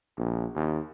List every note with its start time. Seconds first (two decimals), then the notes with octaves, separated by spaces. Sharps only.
0.18 A#1
0.56 D#2